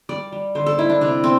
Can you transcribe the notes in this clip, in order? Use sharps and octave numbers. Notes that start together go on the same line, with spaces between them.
G3 D5
G3
D3 C5
A4
G3 E4
D4
C3 D4
C4